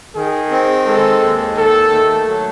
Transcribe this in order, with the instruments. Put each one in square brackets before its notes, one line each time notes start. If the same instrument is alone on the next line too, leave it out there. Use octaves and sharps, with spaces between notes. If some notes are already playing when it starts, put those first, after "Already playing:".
[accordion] D#3 [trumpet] G#4
[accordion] C4
[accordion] G#3 [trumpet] A4
[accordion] D#2
[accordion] D#3 [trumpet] A4
[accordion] A3
F#3